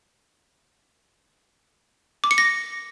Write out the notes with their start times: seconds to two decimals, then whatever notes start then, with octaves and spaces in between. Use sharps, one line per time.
2.24 D6
2.31 C#7
2.38 A#6